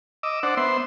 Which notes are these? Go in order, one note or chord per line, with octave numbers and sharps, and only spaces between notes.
D#5 D6 E6
D4 C5 D5 F#5
B3 C5 E5 C6